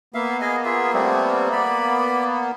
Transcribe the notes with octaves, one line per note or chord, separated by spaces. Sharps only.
A#3 B3 E5 F5
G#4 D#5 G#5
F4 G#4 E5
G3 A3 C4
D5 B5